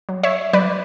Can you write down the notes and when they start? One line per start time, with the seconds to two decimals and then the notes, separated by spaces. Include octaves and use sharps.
0.09 F#3
0.23 C#5 E5
0.53 F#3 B4 D5